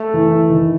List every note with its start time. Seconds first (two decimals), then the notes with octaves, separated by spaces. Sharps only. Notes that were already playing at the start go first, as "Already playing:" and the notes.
Already playing: A3
0.14 E3
0.49 D#3